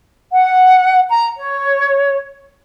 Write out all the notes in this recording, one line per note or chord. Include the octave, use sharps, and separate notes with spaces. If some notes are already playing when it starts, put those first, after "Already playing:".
F#5
A#5
C#5